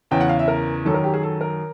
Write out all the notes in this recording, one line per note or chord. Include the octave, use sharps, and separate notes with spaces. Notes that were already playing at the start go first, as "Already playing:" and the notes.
E2 C#3 E3 G5
F#5
F5
E5
A#4
F#2 D#3 F#3 A4
A#4
G4
G#4
A4
A#4